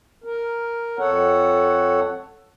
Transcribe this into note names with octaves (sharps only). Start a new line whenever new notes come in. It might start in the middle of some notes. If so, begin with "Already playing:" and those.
A#4
F2 A4 C#5 F#5